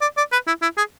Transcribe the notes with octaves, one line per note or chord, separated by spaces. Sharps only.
D5
D5
B4
E4
E4
G#4